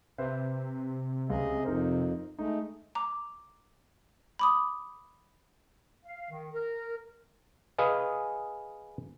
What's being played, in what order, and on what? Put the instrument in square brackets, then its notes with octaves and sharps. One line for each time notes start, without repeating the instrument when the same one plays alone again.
[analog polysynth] C3 [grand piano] B4 C5 E5
[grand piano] C#2 [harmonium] G#4 D#5
[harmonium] F2 [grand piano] D#4 A#4 C5
[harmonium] G#3 A3 [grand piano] D#4
[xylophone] A#5 D6
B5 D6 D#6
[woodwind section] F5
D#3
A#4
[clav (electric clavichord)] G#4 B4 D#5 F5 G#5